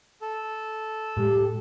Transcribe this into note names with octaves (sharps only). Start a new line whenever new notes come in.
A4
A2 G#3 G4